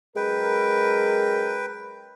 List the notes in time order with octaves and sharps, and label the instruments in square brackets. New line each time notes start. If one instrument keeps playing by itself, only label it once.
[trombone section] F#2 A#4 [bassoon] G#3 [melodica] B4 G5